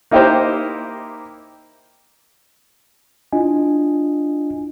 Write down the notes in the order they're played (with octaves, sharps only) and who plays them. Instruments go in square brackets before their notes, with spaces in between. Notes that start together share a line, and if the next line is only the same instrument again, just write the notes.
[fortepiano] A#3 D#4 E4 G4 A#4 C5
[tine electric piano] D4 E4 F4 D#5 G#5